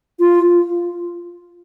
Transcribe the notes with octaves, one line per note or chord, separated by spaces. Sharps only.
F4